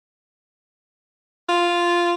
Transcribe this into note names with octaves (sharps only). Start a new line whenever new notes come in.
F4